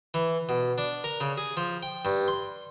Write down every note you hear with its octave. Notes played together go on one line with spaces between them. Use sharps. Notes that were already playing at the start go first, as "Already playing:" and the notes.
E3
B2
D4
A#4
C#3
G#4
F3
G5
G2
C6